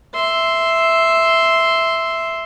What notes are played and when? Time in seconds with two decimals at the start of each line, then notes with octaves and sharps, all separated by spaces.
0.14 E5 C6